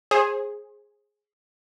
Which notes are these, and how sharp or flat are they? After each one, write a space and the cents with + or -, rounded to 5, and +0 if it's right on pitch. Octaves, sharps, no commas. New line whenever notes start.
G#4 +0 C5 +30